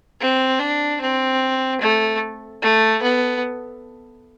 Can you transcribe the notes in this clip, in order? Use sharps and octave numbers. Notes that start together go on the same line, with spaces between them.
C4
D4
C4
A3
A3
B3